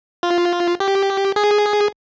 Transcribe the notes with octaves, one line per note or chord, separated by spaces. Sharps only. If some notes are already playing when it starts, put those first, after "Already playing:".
F4
G4
G#4